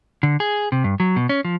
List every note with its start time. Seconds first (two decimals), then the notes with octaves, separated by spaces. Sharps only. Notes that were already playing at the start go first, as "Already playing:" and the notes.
0.23 D3
0.40 G#4
0.72 C3
0.84 G2
1.00 F#3
1.16 B2
1.29 C#4
1.45 F3